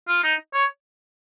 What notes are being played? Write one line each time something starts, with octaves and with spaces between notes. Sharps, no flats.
F4
D#4
C#5